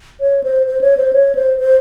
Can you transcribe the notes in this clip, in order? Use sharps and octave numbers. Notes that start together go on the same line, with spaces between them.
C#5
C5
C5
C#5
C5
C#5
C5
C5